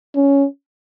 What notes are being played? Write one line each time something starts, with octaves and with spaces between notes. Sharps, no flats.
C#4